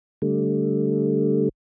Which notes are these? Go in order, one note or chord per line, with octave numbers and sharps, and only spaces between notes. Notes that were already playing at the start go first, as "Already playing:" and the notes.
D3 G3 A3